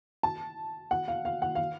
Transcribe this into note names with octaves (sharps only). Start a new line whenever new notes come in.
A5
F#5
F5
F5
F#5
F5